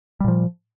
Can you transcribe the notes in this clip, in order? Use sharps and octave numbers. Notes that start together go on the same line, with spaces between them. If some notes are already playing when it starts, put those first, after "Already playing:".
A#2 F3 G3